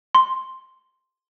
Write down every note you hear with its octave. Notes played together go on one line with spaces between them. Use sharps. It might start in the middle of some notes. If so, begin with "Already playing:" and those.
C6